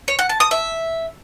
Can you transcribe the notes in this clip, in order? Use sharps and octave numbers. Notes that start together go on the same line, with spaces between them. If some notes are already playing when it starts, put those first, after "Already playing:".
C#5
F#5
A5
D#6
E5